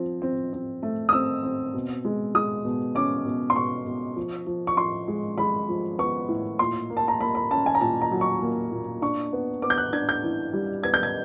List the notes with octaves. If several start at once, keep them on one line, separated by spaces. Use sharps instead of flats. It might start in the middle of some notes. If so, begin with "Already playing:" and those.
Already playing: F3 C4
C4
C4
A3
D#6
C4 E6
C4
B2
G#3
G#3 D#6
B2
C#4 D6
B2
C6
B2 C#6
B2
F3
F3
C#6
F3 C6
G#3
G#3 B5
F3
B3 C#6
A2
A#2 C6
A#3
A5
A#5
A#3 B5
B5
C#4 A5
G#5
A#5
A#2 A5
A#5
F#3
C#6
A#3
A#2
D4 C#6
B3
B3 D6
G6
F#6
D4 G#6
G6
E3
G3
B3 G#6
G6
G#6